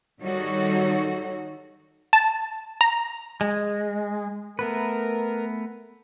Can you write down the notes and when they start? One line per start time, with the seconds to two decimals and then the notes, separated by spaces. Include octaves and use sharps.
0.21 D#3 G3 D#4 F#4 A4 C#5
2.13 A5
2.81 A#5
3.41 G#3
4.59 A3 B3 A#4 B4